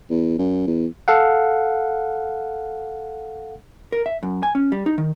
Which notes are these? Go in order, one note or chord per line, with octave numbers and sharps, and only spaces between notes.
E2
F#2
E2
A4 F5 F#5
A#4
E5
F#2
G#5
C#4
G3
D#4
D#3